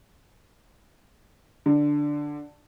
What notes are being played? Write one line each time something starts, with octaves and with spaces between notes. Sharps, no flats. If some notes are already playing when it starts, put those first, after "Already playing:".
D3